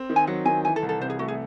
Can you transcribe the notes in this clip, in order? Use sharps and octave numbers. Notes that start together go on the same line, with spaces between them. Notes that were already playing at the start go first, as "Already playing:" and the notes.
Already playing: C4
D#3
G#5
F#3 F#5
D#3 G#5
E3 G#5
A4
C2
A4
C3 C5
G#4
A3 F#4
G#4